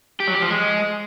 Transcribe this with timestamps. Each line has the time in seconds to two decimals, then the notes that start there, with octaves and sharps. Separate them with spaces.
0.20 G4
0.27 F#3
0.35 G4
0.42 F3
0.50 G#3